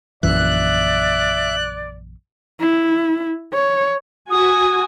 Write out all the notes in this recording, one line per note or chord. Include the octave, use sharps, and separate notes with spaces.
A#1 F#2 E3 D5 E5 F#6
E4
C#5
F#4 G#5 D#6